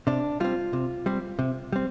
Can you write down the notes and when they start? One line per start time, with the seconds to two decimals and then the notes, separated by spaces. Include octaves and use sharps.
0.07 C3 D4
0.40 G3 C4 F4
0.73 C3
1.06 G3 C4
1.39 C3
1.72 G3 C4